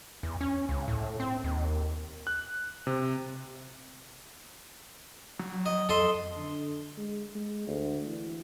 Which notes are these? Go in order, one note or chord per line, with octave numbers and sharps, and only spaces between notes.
E2
C#4
C#2
A2
C4
D#2
F#6
C3
F#3
D#5
F2 A4 D#5 C6
D3
G#3
G#3
D2
E3